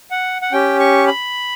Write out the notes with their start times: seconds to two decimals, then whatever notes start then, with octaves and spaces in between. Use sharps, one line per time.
0.11 F#5
0.42 F#5
0.52 C#4 G4 G5
0.80 C#6
1.07 B5